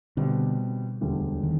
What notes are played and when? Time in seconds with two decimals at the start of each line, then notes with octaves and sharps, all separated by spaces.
0.17 B2 D3 G3 C4
1.01 E1 D2 D3 G3
1.43 D#3